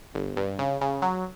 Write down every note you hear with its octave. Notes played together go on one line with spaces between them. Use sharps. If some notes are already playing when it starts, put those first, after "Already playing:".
G1
G2
C#3
C#3
F#3